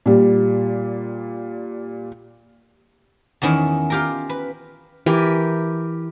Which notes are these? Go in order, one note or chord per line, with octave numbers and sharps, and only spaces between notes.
A#2 G3
E2 D#3 C#4 E4
F4 G4 A#4
B4
E3 G4 A#4 G#5